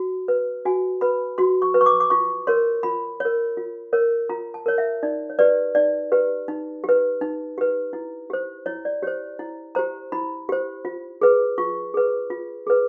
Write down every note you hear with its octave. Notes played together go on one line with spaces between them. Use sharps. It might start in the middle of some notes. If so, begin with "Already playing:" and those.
Already playing: F#4
B4
F#4 G#5
B4 B5
F#4 C6
C#6
B4
C#6
D6
D6
F4 C#6
A#4 C#5 C6
F4 B5
A#4 C#5
F4
A#4 C#5
F4 A#5
A5
A#4 C#5
E5
D#4 D5
C#5
G4 B4 D5
D#4 D5
G4 B4
D#4
G4 B4
D#4
G4 B4
E4
G4 C5
E4 C#5
D5
G4 C5 C#5
E4
G4 C5 A#5
E4 B5
G4 C5
F4
G#4 B4
F4 C#6
G#4 B4
F4
G#4 B4